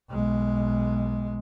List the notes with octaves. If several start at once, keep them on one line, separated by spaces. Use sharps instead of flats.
B1 G#3